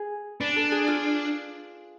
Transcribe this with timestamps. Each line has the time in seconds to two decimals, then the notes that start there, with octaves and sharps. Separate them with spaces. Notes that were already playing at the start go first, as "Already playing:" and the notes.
Already playing: G#4
0.40 D4 B4
0.56 A4
0.72 G#4
0.88 F4